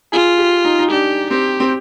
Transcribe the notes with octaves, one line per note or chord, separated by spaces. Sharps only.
F4 G#4
G4
D#4
D#4
D4 G4
C4 G4
C4